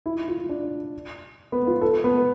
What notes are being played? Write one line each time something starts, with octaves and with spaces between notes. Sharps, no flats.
E4
F4
D4
B3
F4
A4
B3